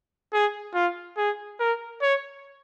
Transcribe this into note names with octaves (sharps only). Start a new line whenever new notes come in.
G#4
F4
G#4
A#4
C#5